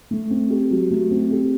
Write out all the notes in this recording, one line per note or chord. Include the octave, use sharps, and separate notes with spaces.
A3
C4
G4
F#3
A3
C4
G4